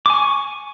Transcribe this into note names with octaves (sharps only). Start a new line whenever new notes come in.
G#5 C#6 D6